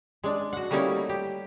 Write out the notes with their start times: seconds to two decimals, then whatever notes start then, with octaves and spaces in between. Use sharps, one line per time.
0.24 G#3 D4
0.53 F#4 F#5
0.70 G3 A3 A#3 C#4 D#4 E4
1.09 G4